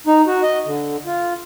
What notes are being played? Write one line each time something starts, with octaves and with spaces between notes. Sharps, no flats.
D#4
F#4
D#5
D3
F4